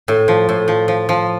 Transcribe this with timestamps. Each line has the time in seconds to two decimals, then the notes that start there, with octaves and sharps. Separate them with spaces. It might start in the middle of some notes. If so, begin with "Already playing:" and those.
0.08 A2
0.28 F3
0.49 A2
0.68 F3
0.88 F3
1.09 F3